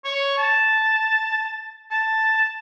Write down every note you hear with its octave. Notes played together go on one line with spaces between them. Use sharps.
C#5
A5
A5